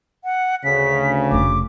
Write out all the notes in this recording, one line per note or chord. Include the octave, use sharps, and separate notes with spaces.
F#5
D2 C#3 B6
F1 F2 D6